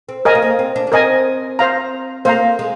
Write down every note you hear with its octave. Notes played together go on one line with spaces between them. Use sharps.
C4
A#3 A#4 D#5 G#5
C4
A#3
C4
D4
D4
C4 A#4 D#5 G#5
C5 F5 A#5
A#3 C5 F5 A#5
G#3